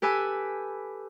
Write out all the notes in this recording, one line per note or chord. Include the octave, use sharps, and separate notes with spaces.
G4 A4 B4 G#5 E6